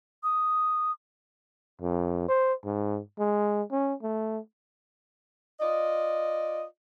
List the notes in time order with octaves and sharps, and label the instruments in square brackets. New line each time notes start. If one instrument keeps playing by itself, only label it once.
[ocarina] D#6
[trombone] F2
C5
G#2
G#3
C#4
A3
[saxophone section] F4 D5 D#5